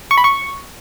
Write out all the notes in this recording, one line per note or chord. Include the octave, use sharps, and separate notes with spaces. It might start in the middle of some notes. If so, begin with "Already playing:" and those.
C#6
B5
C#6